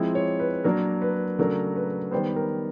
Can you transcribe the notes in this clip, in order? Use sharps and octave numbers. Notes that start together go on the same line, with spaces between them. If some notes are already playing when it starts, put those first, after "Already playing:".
Already playing: F3 G#3 C4 E4
C#5
B4
F#3 A#3 D4 A#4
B4
C#3 F#3 A3 D4 A#4
B4
D#3 G3 B3 C5
A#4